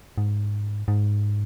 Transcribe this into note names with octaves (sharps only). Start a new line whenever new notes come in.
G#2
G#2